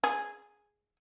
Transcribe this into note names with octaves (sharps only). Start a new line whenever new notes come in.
G#4